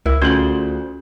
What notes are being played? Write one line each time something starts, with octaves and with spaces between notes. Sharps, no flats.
C#2 E4 A#4 E5
D2 C#4 F4 G#4 C5 F#7